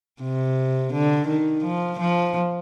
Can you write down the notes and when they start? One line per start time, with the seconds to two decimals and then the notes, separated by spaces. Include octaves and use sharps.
0.22 C3
0.93 D3
1.28 D#3
1.64 F3
2.00 F3